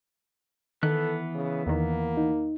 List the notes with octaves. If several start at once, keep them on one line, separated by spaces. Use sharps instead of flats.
D#3 E3 B3 A4 F#6
C#3
E2 D#3 A#3
D#4